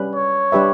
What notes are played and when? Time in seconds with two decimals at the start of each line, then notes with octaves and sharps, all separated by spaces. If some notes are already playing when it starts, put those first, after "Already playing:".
Already playing: G3 C#4 G4 B4
0.15 C#5
0.52 G3 D4 G4 B4 E5